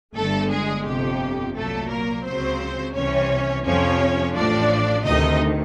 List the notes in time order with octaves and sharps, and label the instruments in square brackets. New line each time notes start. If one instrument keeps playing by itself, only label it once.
[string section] G1 G2 D3 A3 A4
G#3 G#4
G1 F2 C3 G4
C2 A#2 F#3 A3 A4
A#3 A#4
C#2 C#3 F#3 C4 C5
C2 C3 E3 C#4 C#5
F2 C3 F3 C#4 C#5
A1 A2 F3 D4 D5
D2 C3 D#3 D#4 D#5